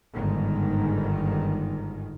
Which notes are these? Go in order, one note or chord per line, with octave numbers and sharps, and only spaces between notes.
G1 G#2 D#3